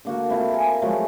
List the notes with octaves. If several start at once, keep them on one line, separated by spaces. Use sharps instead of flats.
D3 A#3 F#4
C4 E4 F4 A5
A#4 G#5
F3 F#3 G#3 A3